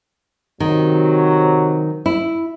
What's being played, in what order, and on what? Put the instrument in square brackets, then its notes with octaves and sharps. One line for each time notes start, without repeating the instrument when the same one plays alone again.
[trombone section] C3 F#3 [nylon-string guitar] D#3
[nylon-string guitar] E4